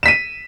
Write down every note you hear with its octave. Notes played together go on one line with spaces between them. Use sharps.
B6 D#7 E7